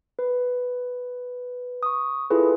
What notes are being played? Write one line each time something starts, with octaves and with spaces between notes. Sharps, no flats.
B4
C#6 D#6
E4 F4 G#4 A4 B4